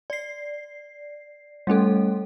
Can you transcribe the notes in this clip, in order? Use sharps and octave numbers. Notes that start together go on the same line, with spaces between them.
D5 C7
G3 A3 C#4 A4